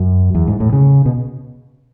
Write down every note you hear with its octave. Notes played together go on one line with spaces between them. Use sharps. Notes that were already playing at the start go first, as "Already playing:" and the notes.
Already playing: F#2
E2
G#2
A2
C#3
B2